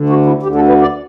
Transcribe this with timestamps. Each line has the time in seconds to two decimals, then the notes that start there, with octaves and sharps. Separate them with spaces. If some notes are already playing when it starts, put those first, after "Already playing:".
Already playing: D2 D3
0.09 F#4
0.26 E4
0.43 D2 G4
0.46 D3
0.55 A4
0.68 B4
0.81 D5